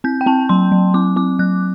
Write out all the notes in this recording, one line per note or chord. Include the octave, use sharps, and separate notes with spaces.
C4 G6
G5
C4 A5
F#3 C6
F#3
C4 D6
C4 D6
F#3 F#6